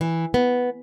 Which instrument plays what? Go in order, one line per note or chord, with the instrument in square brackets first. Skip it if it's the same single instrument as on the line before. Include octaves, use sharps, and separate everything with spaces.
[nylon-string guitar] E3
B3